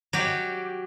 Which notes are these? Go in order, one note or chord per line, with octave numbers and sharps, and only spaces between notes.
F#3 G4